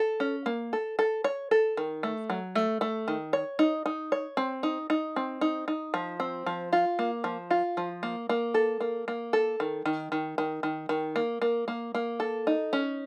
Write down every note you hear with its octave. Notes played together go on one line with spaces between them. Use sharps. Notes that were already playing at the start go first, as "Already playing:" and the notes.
Already playing: A4
C#4
A#3
A4
A4
C#5
A4
D#3
A3
F#3
A3
A3
D#3
C#5
D#4
D#4
C#5
C4
D#4
D#4
C4
D#4
D#4
F3
C4
F3
F4
A#3
F3
F4
F3
A#3
A#3
A4
A#3
A#3
A4
D#3
D#3
D#3
D#3
D#3
D#3
A#3
A#3
A#3
A#3
A4
D#4
C#4